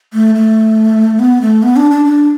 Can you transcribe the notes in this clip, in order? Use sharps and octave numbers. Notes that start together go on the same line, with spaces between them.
A3
A3
B3
A3
B3
D4
D4
D4